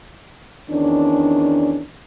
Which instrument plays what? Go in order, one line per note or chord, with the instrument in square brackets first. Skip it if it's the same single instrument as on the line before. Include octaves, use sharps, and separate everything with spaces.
[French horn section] E2 D#3 C#4 D4